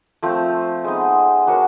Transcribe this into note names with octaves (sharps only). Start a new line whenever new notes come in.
F3 A3 C4
G#3 B3 D#4
D4 F#4 A#4 C#5